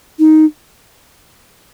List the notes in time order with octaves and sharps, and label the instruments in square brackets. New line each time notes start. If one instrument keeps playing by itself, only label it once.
[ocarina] D#4